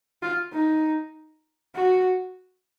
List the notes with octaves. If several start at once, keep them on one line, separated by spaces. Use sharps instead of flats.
F4
D#4
F#4